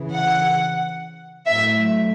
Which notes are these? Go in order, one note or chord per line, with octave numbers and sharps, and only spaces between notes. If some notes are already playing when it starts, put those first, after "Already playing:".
Already playing: C#3 E3
F#5
A2 F#3 E5